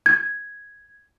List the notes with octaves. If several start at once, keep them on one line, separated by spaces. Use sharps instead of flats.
G#6